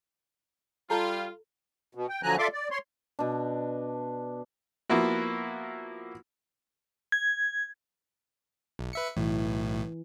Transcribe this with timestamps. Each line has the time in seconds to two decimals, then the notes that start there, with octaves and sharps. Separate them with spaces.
0.90 G3 F4 A4 A5 A#5
1.95 B2
2.09 G5
2.23 D3 F3 F#3 G#5 A#5 F#6
2.38 F4 A4 D5 E5 C6 D6
2.52 D5
2.71 C#5 C6
3.19 B2 D4
4.90 F3 A#3 B3 E4 F#4
7.12 G#6
8.79 B1
8.93 B4 E5 C#7
9.17 B1 A2 E3